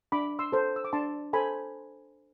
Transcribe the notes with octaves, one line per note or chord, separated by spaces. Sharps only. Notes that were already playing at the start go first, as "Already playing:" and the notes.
D4 B5 D6
C6 E6
A4 C5
E6
D6
D4 A5 C6
A4 C5 G#5 B5